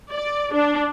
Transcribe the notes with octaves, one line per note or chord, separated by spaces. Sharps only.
D5
D4